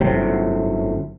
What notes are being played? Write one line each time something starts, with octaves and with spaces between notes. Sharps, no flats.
G1 F#2 A2 C3